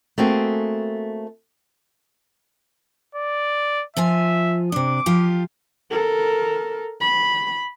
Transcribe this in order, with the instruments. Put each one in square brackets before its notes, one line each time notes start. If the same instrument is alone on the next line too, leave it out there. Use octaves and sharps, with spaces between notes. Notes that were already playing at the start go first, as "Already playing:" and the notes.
[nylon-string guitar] A3 A#3 C4 F#4 G#4
[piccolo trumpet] D5
[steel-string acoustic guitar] F3 F4 G#5 [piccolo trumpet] E5
[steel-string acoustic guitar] C3 D4 [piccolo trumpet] D6
[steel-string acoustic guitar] F3 F4 G4
[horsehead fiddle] A4 A#4
B5